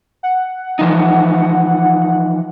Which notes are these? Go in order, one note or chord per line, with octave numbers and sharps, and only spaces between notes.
F#5
E3 F3 D#4